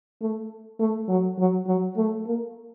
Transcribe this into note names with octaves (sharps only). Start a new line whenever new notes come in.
A3
A3
F#3
F#3
F#3
A3
A#3